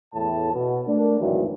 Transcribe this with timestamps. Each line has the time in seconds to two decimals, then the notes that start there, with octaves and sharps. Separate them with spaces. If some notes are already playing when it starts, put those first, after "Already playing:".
0.15 E2 A2 A5
0.53 B2
0.87 A3 D4 A#4
1.20 G#1 D2 G2 D#3 E3 F#3